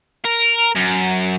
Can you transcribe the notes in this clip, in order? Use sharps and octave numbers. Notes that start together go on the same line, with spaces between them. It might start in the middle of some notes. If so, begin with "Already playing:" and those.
A#4
F#2